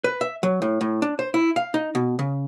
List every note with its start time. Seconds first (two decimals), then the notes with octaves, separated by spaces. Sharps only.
0.04 B4
0.21 E5
0.43 F#3
0.62 A2
0.81 A2
1.02 D4
1.19 C5
1.34 E4
1.56 F5
1.74 D#4
1.95 B2
2.19 C#3